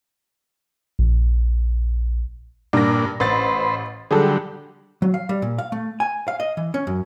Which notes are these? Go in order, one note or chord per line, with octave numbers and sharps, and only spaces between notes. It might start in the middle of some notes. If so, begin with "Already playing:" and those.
A#1
G2 A#2 D4 A#6
A1 B4 C5 A6
D3 F#3 G3 G#4 A4
F#3
F5
G3
A#2
F5
A3
G#5
F5
D#5
E3
C#4
F#2